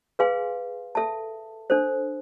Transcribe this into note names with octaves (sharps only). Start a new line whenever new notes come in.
G#4 B4 F5 G#5 C6
A4 E5 A5
D4 A4 C5